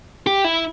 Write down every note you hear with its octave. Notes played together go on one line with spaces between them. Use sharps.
G4
E4